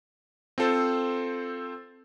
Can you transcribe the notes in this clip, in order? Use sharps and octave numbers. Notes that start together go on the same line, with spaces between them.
C4 F4 A4 C5